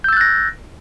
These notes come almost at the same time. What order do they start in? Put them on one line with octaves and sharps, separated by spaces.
G6 E6 A6 F#6 A#6